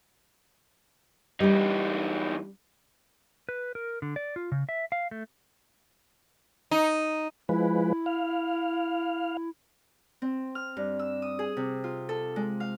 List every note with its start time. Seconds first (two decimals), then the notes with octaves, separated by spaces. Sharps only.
1.40 E2 G3 D4 D#4
3.49 B4
3.75 A#4
4.02 D3
4.16 D5
4.36 F4
4.52 C#3
4.69 E5
4.92 F5
5.11 A3
6.71 D#4
7.49 F3 G#3 E4 B4
8.06 F5
10.22 C4
10.55 F6
10.77 G2
10.99 E6
11.22 D#6
11.39 G#4
11.57 C3
11.84 F4
12.09 A4
12.36 G#3
12.60 F5